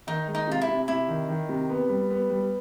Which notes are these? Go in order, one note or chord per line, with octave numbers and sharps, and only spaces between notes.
D#3 D#4
G#3
D#4
C3 F4
E4
C3
C3 E4
D#3
D#3
C3
B3
G3
B3
G3